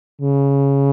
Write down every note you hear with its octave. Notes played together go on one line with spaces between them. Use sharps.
C#3